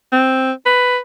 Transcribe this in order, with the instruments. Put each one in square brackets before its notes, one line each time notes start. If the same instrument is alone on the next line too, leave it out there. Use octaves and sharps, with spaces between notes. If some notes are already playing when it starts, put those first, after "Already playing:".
[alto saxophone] C4
B4